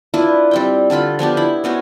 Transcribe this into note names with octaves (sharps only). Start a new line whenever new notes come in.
D4 E4 F4 B4
G3 C4 G5
D3 G3 F4 B5
F3 B3 D4 G4
E4 B5
B3 C#4 F#4 C5